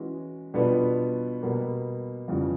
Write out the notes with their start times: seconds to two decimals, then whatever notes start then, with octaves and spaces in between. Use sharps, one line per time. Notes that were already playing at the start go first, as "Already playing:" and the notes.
Already playing: E3 G#3 C#4 F#4
0.54 B2 G3 B3 D4 F4
1.42 B2 G3 A#3
2.28 F2 C#3 E3 G3